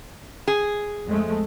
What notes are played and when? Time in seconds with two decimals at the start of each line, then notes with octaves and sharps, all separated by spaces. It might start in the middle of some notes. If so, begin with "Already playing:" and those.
0.48 G#4
1.07 F2 G#3 A3